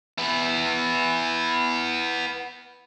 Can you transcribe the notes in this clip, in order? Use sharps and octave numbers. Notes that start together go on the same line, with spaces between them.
B3 E4